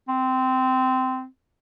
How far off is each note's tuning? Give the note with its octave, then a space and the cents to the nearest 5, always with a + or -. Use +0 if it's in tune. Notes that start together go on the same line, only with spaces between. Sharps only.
C4 -15